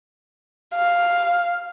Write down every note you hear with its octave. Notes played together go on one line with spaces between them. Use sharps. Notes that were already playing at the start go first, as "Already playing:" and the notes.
F5